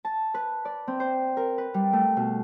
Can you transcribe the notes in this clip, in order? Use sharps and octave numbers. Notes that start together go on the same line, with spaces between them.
A5
B4
D5
C4
C5
A#4
B4
G3
A3
B2